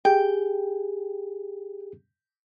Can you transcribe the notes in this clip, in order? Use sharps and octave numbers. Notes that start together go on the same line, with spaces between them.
G4 G#4 G5